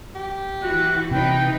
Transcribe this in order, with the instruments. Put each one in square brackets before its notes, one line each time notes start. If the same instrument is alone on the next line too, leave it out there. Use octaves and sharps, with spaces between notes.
[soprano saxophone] G4
[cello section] E3 F#4 [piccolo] F#6
[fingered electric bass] C3 [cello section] E3 D#4 B4 [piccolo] G5